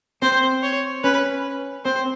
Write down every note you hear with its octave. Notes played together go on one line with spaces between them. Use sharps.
C4 C5
C#5
C#4 B4
C4 C5